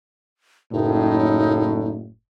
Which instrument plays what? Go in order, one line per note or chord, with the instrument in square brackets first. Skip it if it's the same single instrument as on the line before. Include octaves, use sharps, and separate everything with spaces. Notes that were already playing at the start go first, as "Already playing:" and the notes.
[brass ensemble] F#1 A2 [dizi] D#4